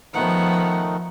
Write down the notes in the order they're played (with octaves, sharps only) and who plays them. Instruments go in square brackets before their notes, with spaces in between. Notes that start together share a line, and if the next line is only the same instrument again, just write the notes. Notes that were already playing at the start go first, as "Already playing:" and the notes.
[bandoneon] D#3 A3 D#4 [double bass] F3 [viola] B3 F#5